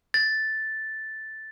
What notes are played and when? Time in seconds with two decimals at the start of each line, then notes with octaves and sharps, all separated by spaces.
0.14 A6